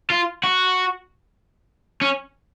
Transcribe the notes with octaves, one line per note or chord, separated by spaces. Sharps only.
F4
F#4
C#4